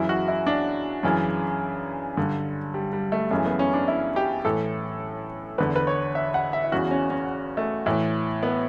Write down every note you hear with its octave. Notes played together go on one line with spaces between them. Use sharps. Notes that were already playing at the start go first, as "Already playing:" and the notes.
Already playing: F#2 C#3 E3 E4
F#4
E4
D4
F#2 C#3 E3
G2 D3
G3
G3
A3
F#2 C#3 E3 A3
B3
C#4
D4
E4
G4
A2 E3 A4
E2 D3 B4
B4
C#5
E5
F#5
E5
E4
E2 C#3 E3 F#4
C#4
C#4
A3
A2 E3
B3